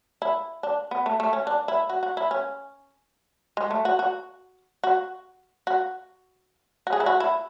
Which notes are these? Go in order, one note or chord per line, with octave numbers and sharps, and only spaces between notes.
E4
D4
B3
A3
A3
C#4
D4
E4
F#4
F#4
E4
C#4
G#3
A3
F#4
F#4
F#4
F#4
F#4
G#4
E4
F#4
E4